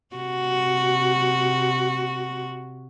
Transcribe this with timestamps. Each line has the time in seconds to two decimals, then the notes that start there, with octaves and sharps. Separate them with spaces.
0.15 C3 F#4